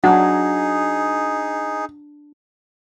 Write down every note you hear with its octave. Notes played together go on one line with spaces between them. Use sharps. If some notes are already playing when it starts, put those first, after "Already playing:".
F#3 D4 D#4 G#4 F#5